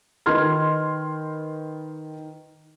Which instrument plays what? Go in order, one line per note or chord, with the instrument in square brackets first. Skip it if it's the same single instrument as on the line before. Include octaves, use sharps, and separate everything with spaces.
[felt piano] D#3 B4 C6 F6 G#6